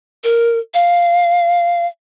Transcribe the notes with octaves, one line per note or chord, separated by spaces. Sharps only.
A#4
F5